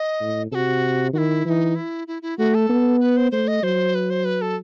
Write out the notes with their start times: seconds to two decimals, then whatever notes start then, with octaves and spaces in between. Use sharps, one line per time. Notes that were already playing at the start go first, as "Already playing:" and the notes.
Already playing: D#5
0.21 A2
0.52 C3 F#4 A4
1.13 D#3 F#4
1.18 E4
1.45 E3 E4
1.50 D#4
1.75 E4
2.08 E4
2.22 E4
2.38 A3 F#4
2.55 A4
2.70 B3
3.00 B4
3.17 C5
3.32 A3 C5
3.48 D#5
3.63 F#3 C5
3.95 B4
4.10 C5
4.25 B4
4.41 A4